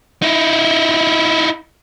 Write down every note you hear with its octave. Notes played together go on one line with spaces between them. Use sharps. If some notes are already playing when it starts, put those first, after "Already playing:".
D#4 E4